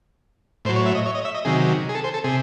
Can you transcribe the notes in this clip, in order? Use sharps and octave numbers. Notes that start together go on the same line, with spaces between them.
A2 F#3 C5
C#5
E5
D#5
C#5
D#5
E5
D#5
C3 D#3 F#3 G#4
G#4
A4
C5
A4
C3 G#4